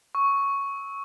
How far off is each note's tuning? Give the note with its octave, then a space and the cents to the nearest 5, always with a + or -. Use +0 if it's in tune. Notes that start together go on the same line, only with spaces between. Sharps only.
C#6 +0 E6 -20